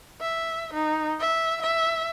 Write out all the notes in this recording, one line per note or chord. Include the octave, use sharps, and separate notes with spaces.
E5
D#4
E5
E5